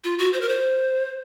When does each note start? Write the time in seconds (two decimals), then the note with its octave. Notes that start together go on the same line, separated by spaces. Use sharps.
0.04 F4
0.19 F#4
0.33 C5
0.41 A#4
0.49 C5